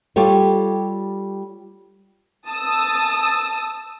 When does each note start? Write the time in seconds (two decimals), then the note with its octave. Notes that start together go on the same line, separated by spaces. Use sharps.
0.16 G3 F4 G4 A4 C#5
2.48 A5 D#6 E6